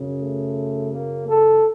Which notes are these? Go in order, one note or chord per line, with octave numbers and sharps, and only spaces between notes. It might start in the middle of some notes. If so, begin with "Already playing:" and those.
Already playing: F#2 C#3
A3
A#3
A4